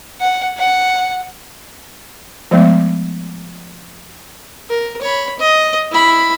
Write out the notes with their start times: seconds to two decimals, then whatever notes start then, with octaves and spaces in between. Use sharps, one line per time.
0.21 F#5
0.58 F#5
2.51 F3 G#3 A3 B3
4.69 A#4
5.02 C#5 B5
5.40 D#5
5.92 E4 B5